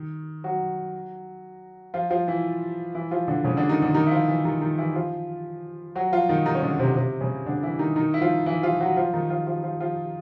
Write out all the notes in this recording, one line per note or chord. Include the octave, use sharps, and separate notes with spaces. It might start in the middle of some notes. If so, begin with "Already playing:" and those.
Already playing: D#3
F#3 F#4
F3 F4
F3 F4
E3 E4
E3 E4
F3 F4
D3 D4
C#3 C#4
D3 D4
D#3 D#4
D3 D4
D#3 D#4
E4
F3 F4
E3 E4
D#3 D#4
D#3 D#4
E3 E4
F3 F4
F#3 F#4
F3 F4
D#3 D#4
D#3 D#4
C#4
D3 D4
C3 C4
C3 C4
C#3 C#4
D3 D4
E3 E4
D#3 D#4
D#3 D#4
E4
F3 F4
E3 E4
F3 F4
F#3 F#4
F3 F4
D#3 D#4
F3 F4
F3 F4
F3 F4
F3 F4